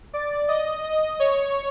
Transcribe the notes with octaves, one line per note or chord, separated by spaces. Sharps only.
D5
D#5
D#5
C#5